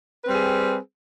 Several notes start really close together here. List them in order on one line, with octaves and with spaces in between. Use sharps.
B4 C4 G3 G#4